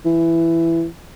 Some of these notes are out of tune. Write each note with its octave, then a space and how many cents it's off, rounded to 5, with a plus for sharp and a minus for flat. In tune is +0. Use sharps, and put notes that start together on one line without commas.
E3 +10